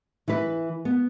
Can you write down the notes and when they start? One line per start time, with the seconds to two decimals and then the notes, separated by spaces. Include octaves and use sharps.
0.28 E3 E4 B4
0.85 B3